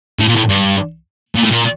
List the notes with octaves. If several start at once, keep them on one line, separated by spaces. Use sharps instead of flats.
A2
A#2
A2
G2
A#2
A2
A#2